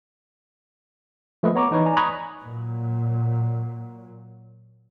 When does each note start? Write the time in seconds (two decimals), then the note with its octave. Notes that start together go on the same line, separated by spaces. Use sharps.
1.43 F3 A3 A#3 B4 D#5
1.55 B3 C#5 A#5 C#6 D6
1.71 E3 D#4 B4 C#5
1.85 D5 G#5 A#5
1.97 A#5 B5 C#6 D#6 F#6 G#6
2.42 A#2 F#3